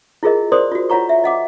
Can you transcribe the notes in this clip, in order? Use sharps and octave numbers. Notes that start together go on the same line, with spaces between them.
E4 F4 G#4 A#4 D#5
A#4 C5 D5 C6 D#6
F4 F#4
E4 F4 C#5 F#5 A#5 C#6
E5
D#5 F#5 D6